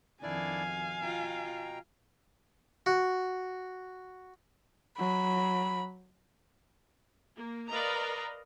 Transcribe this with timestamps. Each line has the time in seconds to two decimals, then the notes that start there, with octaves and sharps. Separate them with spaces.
0.23 F2 D#3 D4 E4 D5 F5 G#5
0.66 B2
1.02 B2 F4 G5 A#5
2.86 F#4
4.99 F#3 B5
7.37 A#3
7.71 A#4 B4 D5 D#5 F5 A#5